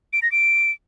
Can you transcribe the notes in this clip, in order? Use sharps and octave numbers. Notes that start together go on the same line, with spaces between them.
D7
A#6
D7